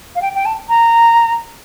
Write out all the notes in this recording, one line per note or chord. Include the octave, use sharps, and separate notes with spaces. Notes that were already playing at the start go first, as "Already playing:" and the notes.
F5
G5
G5
A5
A#5